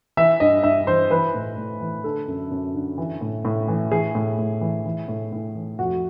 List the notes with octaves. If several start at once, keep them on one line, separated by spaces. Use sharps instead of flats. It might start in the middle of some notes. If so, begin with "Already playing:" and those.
E3 E5
G2 D#5
G2 E5
E3 C5
E3 B4
A2
A2
E3
D3 A4
F#2
F#2
D3
E3
A2
A2
E3
E3 G#4
A2
A2
E3
E3
A2
A2
E3
F2 F#4